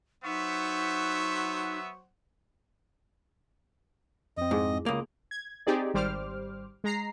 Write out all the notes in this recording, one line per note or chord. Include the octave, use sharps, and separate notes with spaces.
F#3 B3 D#4 C5 E5 F#5 C#6
F2 C4 D#5
G#2 E4 G#4
C#2 A#3 D6 D#6
G#6
C4 D#4 G4 G#4 D5
G#1 G3 C5 D6 F6
G#3 A#5 C7